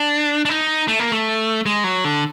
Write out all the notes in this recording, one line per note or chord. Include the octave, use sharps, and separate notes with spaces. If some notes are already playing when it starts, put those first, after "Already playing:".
Already playing: D4
D4
D#4
A3
A#3
A3
G#3
F#3
D3